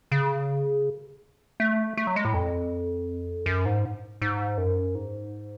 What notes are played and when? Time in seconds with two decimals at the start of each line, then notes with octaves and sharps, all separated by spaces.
0.12 C#3
1.60 A3
1.97 A3
2.07 F#3
2.16 G#3
2.25 A2
2.34 F2
3.46 F#2
3.65 G#2
4.22 G#2
4.58 F#2
4.95 G#2